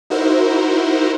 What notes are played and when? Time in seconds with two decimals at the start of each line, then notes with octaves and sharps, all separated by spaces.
0.10 D#4 E4 F#4 A#4 C5